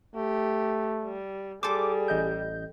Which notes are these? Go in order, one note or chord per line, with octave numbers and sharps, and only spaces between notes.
A3 G4
G3
G3 G#4 A4 C5 D6
A1 D#5 G6